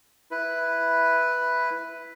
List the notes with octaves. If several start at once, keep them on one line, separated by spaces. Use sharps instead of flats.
E4 B4